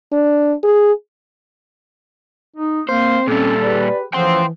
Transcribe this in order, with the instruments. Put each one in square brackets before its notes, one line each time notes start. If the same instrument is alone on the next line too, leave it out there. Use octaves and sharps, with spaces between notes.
[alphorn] D4
G#4
[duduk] D#4
[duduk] A#3 [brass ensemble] C4 [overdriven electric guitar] C5
[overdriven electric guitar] A#2 G3 [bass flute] C#4 [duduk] A4
[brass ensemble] G4 G#4 B4 [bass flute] D5
[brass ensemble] A2 C#3 F#5 [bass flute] E3 [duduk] F3 [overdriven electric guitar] G5 C6